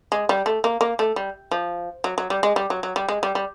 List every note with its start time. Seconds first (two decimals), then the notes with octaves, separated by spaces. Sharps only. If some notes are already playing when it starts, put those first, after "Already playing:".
0.12 G#3
0.29 G3
0.46 A3
0.64 A#3
0.81 A#3
0.99 A3
1.16 G3
1.51 F3
2.04 F#3
2.18 F#3
2.30 G3
2.43 G#3
2.56 G3
2.70 F#3
2.83 F#3
2.96 G3
3.09 G#3
3.23 G3
3.35 G3